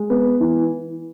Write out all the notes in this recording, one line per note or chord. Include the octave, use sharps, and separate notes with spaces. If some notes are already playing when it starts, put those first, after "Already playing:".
Already playing: G#3
B3
E3